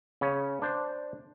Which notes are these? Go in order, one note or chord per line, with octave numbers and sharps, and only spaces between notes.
C#3 C#4
D4 C5